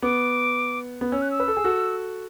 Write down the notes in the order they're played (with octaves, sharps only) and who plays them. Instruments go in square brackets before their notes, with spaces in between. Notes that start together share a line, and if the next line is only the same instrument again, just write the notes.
[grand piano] B3 [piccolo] D6
[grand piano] B3
[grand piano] C#4 [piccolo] E6
[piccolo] F#6
E6
[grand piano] B4
A4
G#4
F#4 A4